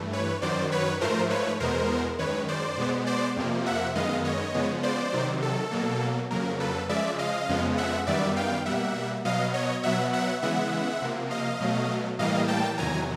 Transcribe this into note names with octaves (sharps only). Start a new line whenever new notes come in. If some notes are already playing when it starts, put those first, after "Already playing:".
Already playing: G2 E3 A3
B4 C#5
F#2 D#3 F#3 C5 D5
B4 C#5
G#2 F3 A3 A#4 C5
B4 C#5
E2 B2 G#3 B3 A#4 C5
F#2 D#3 G#3 B4 C#5
C5 D5
B2 G#3 B3
C5 D5
F2 C3 F3 A#3
E5 F#5
F#2 D#3 G#3 B3 D#5 F5
C#5 D#5
C#3 F3 G#3 B3
C5 D5
C3 D#3 F#3
A4
B2 F#3 A#3
F2 C#3 F#3 A#3 A#4
A4 B4
C#3 F3 G#3 D5 E5
D#5 F5
F2 C#3 F3 G#3 B3
E5 F#5
F#2 D#3 G3 B3 D5 E5
F5 G5
B2 G3 A#3 E5 F#5
B2 F#3 B3 D#5 F5
C#5 D#5
B2 F#3 B3 E5 F#5
E5 F#5
C#3 E3 G#3 B3 E5 F#5
C3 F3 A#3
D#5 F5
B2 F#3 A3
A2 E3 G3 A#3 D#5 F5
G5 A5
E2 C3 D#3 F#3 G#5 A#5